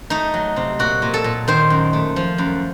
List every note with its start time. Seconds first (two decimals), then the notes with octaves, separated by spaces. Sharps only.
0.10 A3 D#4
0.34 F#3
0.56 C3
0.79 A#2 F#4
1.02 A#2
1.14 A4
1.24 A#2
1.48 D#3 C5
1.70 F#2
1.93 A3
2.16 F3
2.38 F#2